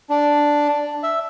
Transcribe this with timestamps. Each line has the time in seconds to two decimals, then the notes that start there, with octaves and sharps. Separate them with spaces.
0.10 D4
1.03 E5